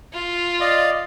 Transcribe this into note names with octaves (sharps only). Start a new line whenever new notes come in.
F4
D5 D#5 F5